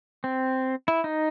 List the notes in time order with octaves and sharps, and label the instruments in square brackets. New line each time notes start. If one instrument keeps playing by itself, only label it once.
[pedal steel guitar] C4
E4
D#4